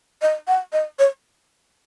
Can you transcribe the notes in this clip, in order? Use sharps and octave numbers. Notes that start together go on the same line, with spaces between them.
D#5
F#5
D#5
C#5